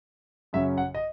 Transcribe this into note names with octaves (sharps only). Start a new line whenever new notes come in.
F#2 C#3 F#3 C#4 E5
F#5
D#5